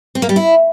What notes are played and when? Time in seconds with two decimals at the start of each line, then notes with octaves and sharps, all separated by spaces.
0.15 C4
0.22 A#3
0.29 G3
0.36 E4